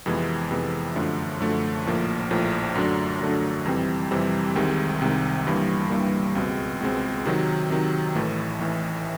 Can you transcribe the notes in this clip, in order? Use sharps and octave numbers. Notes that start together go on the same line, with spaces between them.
F2 C3 E3 G#3 B3
F2 C3 E3 G#3 B3
F#2 D3 F3 A3
F#2 D3 F3 A3
A#1 A2 F3 A#3
A#1 A2 F3 A#3
F#2 D3 F#3 A3 D4
F#2 D3 F#3 A3 D4
F2 C3 E3 G3 C4
F2 C3 E3 G3 C4
C2 C3 D#3 G#3
C2 C3 D#3 G#3
G1 G2 E3 G3 A#3
G1 G2 E3 G3 A#3
C#2 B2 G#3 C4
C#2 B2 G#3 C4
C3 D#3 F#3
C3 D#3 F#3
A1 A2 E3 A3
A1 A2 E3 A3